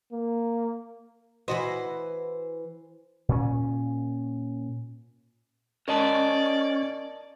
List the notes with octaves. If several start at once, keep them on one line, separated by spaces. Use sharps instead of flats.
A#3
E3 F#4 C5 D#5
A#2 C#4
C#4 A#4 D5 D#5 A5